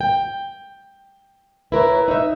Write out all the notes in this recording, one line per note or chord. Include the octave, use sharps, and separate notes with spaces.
G5
E4 A#4 B4 C#5
D#4 E5